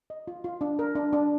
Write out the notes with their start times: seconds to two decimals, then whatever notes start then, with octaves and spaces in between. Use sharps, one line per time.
0.10 D#5
0.27 F4
0.44 F4
0.61 D4
0.79 A#4
0.95 D4
1.13 D4